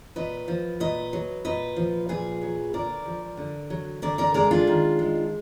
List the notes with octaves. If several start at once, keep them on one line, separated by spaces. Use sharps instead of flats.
A#2 B4 D#5
F3
A#2 B4 D#5
F#3
A#2 B4 D#5
F3
A#2 G#4 B4
F#3
D3 A#4 D5
F3
D3
F#3
D3 A#4 D5
A#4 D5
G#3 A#4 D5
D4 F4
D#3
G#3